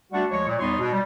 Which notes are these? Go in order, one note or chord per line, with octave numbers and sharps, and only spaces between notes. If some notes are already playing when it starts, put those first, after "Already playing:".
G3 A3 D4 F#4
D2 F3 G#3 C#5
A#2
E2 G3 B3 D#4 C#5 C6
B2
G3